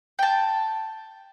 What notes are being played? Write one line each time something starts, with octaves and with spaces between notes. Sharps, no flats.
G5 A5